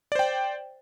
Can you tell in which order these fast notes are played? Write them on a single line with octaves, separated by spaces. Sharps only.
D5 C5 G5